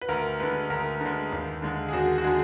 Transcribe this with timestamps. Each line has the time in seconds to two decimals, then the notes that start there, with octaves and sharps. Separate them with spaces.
0.01 B4
0.09 D2 A#4
0.40 D3 G#3 B4
0.70 D2 A#4
1.01 D3
1.06 G#3
1.32 D#2
1.62 D3 G#3
1.89 G#4
1.93 D#2 F#4
2.18 F#4
2.24 D3 G#3 G#4